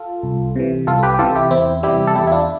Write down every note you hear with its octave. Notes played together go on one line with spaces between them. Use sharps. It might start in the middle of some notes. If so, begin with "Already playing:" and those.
Already playing: F4 A4
C2
C3 E3
C2 F4 A4
G4 B4
G4
C3 E3 F4 A4
E4 G4
E2 C4 E4
C3 E3 G3 E4 G4
A4
E2 E4 G4
E4
D4 F4